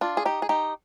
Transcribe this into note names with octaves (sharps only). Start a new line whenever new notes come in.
D4 F4
G#4
D#4 G4
G#4
D#4 G4